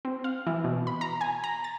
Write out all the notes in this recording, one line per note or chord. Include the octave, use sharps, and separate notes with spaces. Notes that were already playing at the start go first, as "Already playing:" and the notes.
C4
F5
E3
B2
B5
A#5
G#5
A#5
A6